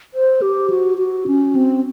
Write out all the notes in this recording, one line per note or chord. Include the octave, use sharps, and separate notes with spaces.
C5
G4
F#4
F#4
C#4
C4